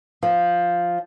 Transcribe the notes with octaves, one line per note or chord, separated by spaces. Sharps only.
F3